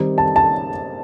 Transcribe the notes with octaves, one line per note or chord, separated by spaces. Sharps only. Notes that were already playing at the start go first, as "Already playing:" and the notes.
Already playing: D#3 G3 C4 D#4
A5
A5